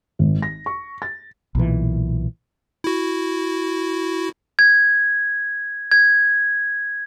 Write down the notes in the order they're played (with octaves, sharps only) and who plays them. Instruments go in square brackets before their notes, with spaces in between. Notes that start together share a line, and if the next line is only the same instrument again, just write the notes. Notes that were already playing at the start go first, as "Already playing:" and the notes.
[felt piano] G#1
A#6
C#6
A6
[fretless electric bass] B1 A#2 E3
[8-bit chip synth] E4 F#4
[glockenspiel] G#6
G#6